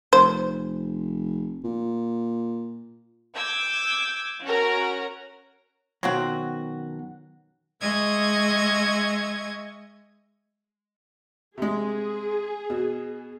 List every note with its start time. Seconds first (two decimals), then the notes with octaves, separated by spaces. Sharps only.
0.13 F1 C5
1.64 A#2
3.36 D6 E6 G6 G#6
4.44 C#4 F#4 A#4
6.03 F#2 B2 D#3 F#3 C4 F#4
7.81 G#3 D#5 E5 C#6 G#6
11.58 C3 G#3 G#4
12.70 B2